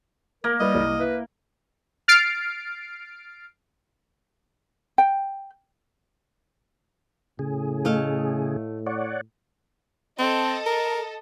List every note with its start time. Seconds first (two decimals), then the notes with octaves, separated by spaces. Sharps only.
0.44 A#3 A#4
0.60 G3 E4 B4 D#5
0.75 C2
1.00 E4 B4
2.08 F6 A6 C7 D7
4.98 G5
7.39 A2 C#3 G#4
7.85 A3 D#5 F5
8.86 C#5 D5 F#5
10.19 C4 A4 D#5
10.66 A#4